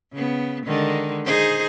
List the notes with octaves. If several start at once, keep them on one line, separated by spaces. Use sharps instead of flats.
C#3 B3
D3 D#3 G#3
D#4 G#4 C5